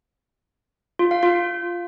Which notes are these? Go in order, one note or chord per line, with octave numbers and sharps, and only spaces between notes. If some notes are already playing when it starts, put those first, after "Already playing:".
F4
F5
F4